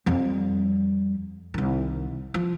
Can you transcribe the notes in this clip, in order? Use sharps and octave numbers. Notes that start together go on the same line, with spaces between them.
F2 G3
C2 D#3
F3